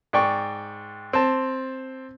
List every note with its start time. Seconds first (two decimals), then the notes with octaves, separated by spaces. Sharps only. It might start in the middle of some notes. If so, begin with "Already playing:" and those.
0.13 G#2 D5 G5 C#6
1.13 C4 A5